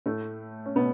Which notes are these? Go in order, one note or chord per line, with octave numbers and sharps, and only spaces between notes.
A2 A3
C#4
B2 B3